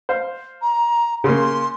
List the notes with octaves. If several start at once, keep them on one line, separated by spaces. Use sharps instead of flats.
C5 F5
A#5
C#3 A#3 C6